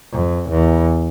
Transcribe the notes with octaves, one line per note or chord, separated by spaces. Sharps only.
F2
E2